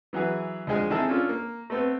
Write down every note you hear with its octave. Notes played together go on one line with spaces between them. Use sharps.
E3 F#3 E4 G#4 B4
D2 F3 G#3 G#4
D#3 C4 E4 G#4 A4 A5
C#4 D4 F4 A4
A#3
A3 B3 C4